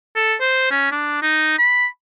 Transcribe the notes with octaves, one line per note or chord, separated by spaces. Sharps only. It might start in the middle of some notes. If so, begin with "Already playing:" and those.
A4
C5
C#4
D4
D#4
B5